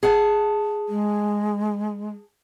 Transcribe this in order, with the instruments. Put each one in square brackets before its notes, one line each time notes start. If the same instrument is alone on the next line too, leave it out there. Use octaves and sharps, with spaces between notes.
[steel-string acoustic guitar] G#4 F#5 A5
[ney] G#3